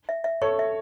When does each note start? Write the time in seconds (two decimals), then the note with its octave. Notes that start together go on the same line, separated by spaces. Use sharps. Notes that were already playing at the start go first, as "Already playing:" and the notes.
0.09 E5
0.24 E5
0.42 A4 C#5 C#6
0.59 E5